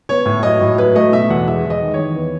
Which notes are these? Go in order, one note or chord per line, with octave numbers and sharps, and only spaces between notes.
B3 C#5
A2
F#3 D#5
A2
F#3 B4
A3 D#5
B2 E5
E2 F#5
G#3 E5
E2
D#5
D#3
E2 C#5
B3